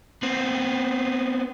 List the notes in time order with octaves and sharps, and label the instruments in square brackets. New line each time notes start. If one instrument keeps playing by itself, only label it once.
[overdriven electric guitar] B3 C4